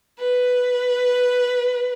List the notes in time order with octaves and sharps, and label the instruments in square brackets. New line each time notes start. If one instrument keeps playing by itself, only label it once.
[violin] B4